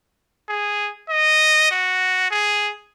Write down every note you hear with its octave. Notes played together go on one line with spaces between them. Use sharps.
G#4
D#5
F#4
G#4